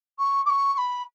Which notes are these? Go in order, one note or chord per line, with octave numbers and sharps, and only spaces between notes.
C#6
D6
C#6
C#6
B5